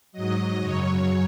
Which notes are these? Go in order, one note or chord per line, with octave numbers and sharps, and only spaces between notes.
G#2 F#3 D#5
F#2 C#3 F#3 C#5